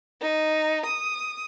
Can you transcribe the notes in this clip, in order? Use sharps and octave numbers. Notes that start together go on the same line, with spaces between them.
D#4
D#6